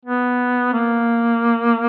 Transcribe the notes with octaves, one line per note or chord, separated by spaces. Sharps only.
B3
A#3